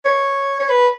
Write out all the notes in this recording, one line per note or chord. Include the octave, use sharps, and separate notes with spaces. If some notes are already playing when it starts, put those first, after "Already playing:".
C#5
C#5
B4